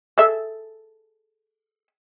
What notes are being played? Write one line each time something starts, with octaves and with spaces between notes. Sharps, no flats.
G#4 A4 E5